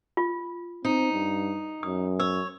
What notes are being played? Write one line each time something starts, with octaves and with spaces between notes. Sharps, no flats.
F4
C4 D#4
G2
F#2 D#6
C#5 E6